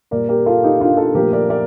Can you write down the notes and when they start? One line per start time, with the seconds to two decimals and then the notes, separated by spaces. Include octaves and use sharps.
0.11 A#2 G3 A#4 D5
0.29 G4 A#4
0.46 F4 A4
0.63 D#4 G4
0.80 D4 F4
0.97 F4 A4
1.14 A#2 F3 A3 G4 A#4
1.33 A#4 D5
1.50 A#4 D5